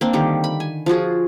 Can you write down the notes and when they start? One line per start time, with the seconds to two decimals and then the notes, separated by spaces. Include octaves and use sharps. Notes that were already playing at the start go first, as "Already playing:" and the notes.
0.01 A#3 C4 D4
0.13 D3 D#3 G3 G4
0.44 B5
0.60 G#5
0.86 F3 F4 F#4 G#4